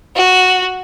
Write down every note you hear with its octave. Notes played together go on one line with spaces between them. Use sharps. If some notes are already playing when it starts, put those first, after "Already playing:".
F#4